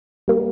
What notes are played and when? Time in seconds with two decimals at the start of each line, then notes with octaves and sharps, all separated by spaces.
0.28 G3 A#3